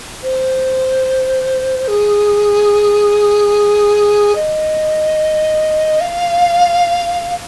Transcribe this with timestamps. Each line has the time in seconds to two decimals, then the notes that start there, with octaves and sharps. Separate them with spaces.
0.23 C5
1.88 G#4
4.35 D#5
6.01 F5